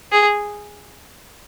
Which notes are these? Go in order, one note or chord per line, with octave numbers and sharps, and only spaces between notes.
G#4